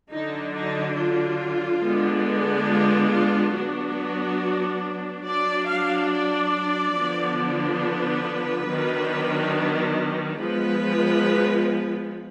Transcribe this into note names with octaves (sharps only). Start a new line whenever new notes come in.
D3 F#3 D4 D#4
D#4
F4
D3 G#3 B3 D4
F4
F4
F#3 B3 D4 F#4
F#3 D4 D5
F5
D5
D3 F3 B3 D4
B4
D#3 F#3 B3 D4
F3 G#3 B3 B4